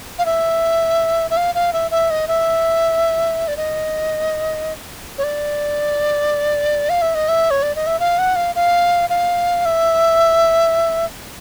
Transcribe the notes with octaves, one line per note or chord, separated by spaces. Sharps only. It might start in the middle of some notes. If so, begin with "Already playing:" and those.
F5
E5
E5
F5
F5
E5
E5
D#5
E5
D5
D#5
C#5
D5
F5
E5
D#5
E5
C#5
D5
D#5
E5
F5
F#5
F5
F5
F5
E5